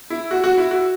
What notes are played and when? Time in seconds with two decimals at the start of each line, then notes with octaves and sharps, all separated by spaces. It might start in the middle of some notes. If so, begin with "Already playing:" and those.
0.10 E4
0.31 F#4
0.44 F#4
0.58 E4
0.71 F#4